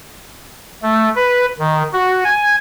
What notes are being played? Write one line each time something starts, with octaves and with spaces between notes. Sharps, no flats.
A3
B4
D#3
F#4
G#5